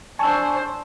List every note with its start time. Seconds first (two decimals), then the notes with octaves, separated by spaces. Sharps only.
0.19 D4 C5 G#5 A5 C#6 E6